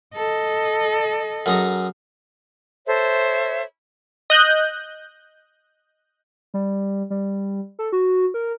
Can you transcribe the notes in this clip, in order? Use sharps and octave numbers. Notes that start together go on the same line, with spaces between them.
A4 D#5
F#2 G#4 A#5
A4 C5 C#5 E5
D#5 F#6 G6
G3
G3
A4
F#4
A#4